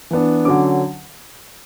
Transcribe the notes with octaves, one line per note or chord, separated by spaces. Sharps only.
E3 B3 D4
D3 F#3 C#4 D6